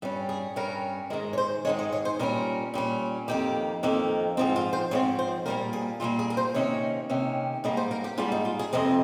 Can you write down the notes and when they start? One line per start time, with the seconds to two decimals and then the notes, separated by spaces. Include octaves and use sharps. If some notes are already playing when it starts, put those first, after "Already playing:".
0.02 G2 G3 C#4
0.29 G#4
0.56 G2 G3 C#4 A#4
1.10 G#2 D#3 G#3 A#4
1.33 C#5
1.38 C5
1.65 G#2 D#3 G#3 C#5
1.79 D#5
1.92 C#5
2.05 C5
2.19 A#2 G3 C#4 A#4
2.74 A#2 G3 C#4
3.28 F2 D#3 A#3 G4
3.83 F2 D#3 A#3
4.37 G#2 F3 C4 D#4
4.56 F4
4.73 C5
4.91 G#2 F3 C4 C#5
5.19 C5
5.46 A#2 G3 A#3 A#4
5.73 G#4
6.00 A#2 G3 A#3 F4
6.19 G#4
6.30 A#4
6.37 C5
6.54 C3 D#3 A#3 C#4 C#5
7.09 C3 D#3 A#3 C#4
7.64 G#2 G3 A#3 D#5
7.77 C5
7.91 A#4
8.04 G4
8.18 G#2 G3 A#3 F4
8.32 D#4
8.45 F4
8.59 G#4
8.73 F2 C3 F3 C4 D#5